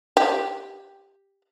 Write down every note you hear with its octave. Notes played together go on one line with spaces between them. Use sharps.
G4